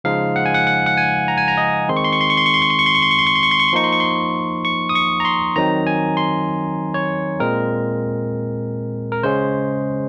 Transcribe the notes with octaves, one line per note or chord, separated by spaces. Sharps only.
C#3 F3 G#3 D#4 F5
F#5
G#5
F#5
F#5
F#5
G#5
A#5
G#5
A#5
D#5
D#3 G#3 C4 D#4 C6
C#6
C6
C#6
C6
C#6
C6
C#6
C6
C#6
C6
C#6
C6
C#6
C6
C#6
C6
C#6
C6
C#6
C6
C#6
C6
F3 A#3 D#4 C#6
C6
C#6
C6
C#6
D#6
C#6
A#5
C6
D#3 F#3 C4 D#4 A#5
G#5
C6
C#5
A#2 G#3 C4 A#4
A#4
C#3 G#3 C#4 C5